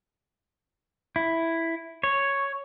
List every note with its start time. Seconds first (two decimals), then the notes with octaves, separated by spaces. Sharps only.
1.16 E4
2.03 C#5